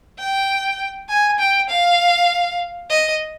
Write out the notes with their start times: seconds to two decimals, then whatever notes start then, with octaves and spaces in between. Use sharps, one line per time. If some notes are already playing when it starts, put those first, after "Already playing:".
0.19 G5
1.09 G#5
1.39 G5
1.70 F5
2.90 D#5